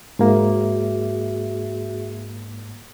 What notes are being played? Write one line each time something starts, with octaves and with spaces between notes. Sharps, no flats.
G#2 A#3 F#4 G#4 E5